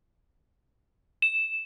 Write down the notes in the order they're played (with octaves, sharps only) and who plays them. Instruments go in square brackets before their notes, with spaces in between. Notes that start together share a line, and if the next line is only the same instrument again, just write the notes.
[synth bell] E7